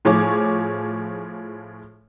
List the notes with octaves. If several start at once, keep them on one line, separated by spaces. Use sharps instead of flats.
A2 F3 G#4 C#5 D6